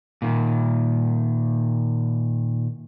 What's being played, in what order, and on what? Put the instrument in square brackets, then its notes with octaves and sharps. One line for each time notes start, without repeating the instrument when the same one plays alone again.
[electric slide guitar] A#2 D#3